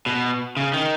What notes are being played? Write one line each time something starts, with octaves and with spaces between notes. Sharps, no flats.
B2
C#3
D#3